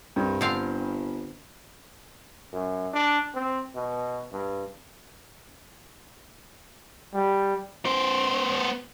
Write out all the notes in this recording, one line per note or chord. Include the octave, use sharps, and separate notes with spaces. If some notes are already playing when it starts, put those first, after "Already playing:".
C2 G2
G1 D3 C4 F5
F#2
D4
C4
B2
G2
G3
B3 C5